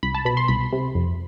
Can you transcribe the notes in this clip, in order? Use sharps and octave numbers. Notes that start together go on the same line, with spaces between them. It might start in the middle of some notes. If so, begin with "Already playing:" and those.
C2 B5
A5
B2 B5
C6
C2 B5
C3
F2